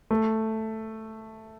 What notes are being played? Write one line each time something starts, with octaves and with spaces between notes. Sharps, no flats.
A3